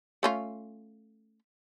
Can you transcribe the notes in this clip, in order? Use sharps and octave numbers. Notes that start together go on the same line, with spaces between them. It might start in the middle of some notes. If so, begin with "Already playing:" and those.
A3 C#4 F4